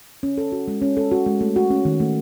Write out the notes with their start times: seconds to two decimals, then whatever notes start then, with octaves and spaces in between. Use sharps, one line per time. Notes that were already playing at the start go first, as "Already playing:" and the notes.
0.23 C#4
0.38 A4
0.52 F#4
0.68 G#3
0.82 C#4
0.97 A4
1.11 F#4
1.26 G#3
1.41 A3
1.56 F#4
1.71 C#4
1.85 D#3
2.00 A3